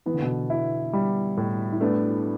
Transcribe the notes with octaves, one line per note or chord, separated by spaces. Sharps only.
E3 B3
D3
B2 E3
E4
G3
A2
E4
A3 B3 D4